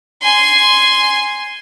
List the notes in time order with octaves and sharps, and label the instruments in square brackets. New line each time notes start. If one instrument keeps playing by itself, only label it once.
[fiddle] G#5 C6